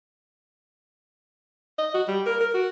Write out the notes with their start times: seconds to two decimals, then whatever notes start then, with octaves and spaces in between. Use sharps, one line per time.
1.79 D#5
1.94 F#4
2.08 G3
2.26 A#4
2.40 A#4
2.54 F#4